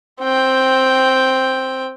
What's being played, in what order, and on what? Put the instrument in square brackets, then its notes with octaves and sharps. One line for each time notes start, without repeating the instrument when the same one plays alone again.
[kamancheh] C4 G5